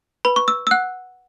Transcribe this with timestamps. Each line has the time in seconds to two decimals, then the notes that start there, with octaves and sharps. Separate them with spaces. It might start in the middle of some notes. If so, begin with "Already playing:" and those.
0.25 B4 B5
0.36 C#6
0.48 E6
0.67 E6
0.71 F#5 F#6